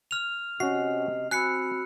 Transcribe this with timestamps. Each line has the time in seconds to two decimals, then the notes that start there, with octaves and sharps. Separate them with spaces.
0.11 F6 F7
0.60 C3 C#4 F#4 D#5 C7
1.31 C4 F#4 G#5 B5 E6 F#6 C7 C#7